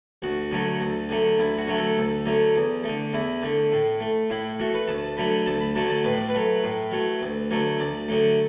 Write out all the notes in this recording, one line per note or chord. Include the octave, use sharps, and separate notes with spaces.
D2 F#4
D3 F#3 A3
D2
D3 F#3 A3
D2 E4
F#4
D3 F#3 A3
A4
D2
D3 F#3 A3
E2
D3 A3
E2 E4
D3 A3
A2
A3
A2 E4
A3 F#4
B4
D2 A5
D3 F#3 A3 B5
D2 A5
B5
D3 F#3 A3 A5
D5
A2 B4
D5
B4
F#3 A3
A2
F#3 A3
D2
D3 F#3 A3
D2 D5
D3 F#3 A3